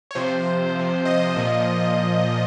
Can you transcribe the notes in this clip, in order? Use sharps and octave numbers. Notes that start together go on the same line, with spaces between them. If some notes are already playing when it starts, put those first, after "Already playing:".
C#5
C3 F3 C5
C3 F3
D#5
A#2 F3